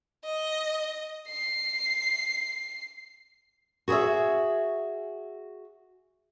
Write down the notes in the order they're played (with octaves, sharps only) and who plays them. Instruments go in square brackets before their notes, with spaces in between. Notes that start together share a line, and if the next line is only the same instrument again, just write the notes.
[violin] D#5
C7
[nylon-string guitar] F#4 G#4 A#4 C#5 E5